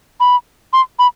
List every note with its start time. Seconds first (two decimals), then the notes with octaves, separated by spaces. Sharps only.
0.20 B5
0.73 C6
0.99 B5